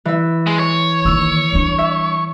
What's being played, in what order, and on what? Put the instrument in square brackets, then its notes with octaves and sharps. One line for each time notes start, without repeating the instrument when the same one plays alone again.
[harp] E3 E5
[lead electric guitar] G#3
C#5
[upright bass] D#3 A#3 [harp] E6
[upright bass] G3 D4
[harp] E5